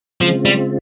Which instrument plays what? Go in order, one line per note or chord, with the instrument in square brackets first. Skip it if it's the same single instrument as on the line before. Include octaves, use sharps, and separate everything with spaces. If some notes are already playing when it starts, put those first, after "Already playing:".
[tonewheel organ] C#3 G#3 C4 F4 [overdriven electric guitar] F3
[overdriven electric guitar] G3